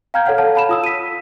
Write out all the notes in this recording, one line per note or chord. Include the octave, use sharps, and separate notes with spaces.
F5 G5 A#5 F6 G6 G#6
A4 C#5 F5 F#5 F6
A4 C#5 F5 A5
A5 B5 E7
F4 D#6 E6
B6 D#7